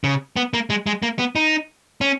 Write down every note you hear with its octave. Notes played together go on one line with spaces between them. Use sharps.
C#3
B3
A#3
G#3
G#3
A#3
B3
D#4
C#4